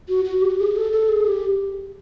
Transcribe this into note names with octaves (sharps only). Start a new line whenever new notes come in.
F#4
F#4
G4
G#4
A4
A4
G#4
G4